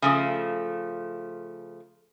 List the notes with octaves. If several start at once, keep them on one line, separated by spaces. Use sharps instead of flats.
C#3 F3 A3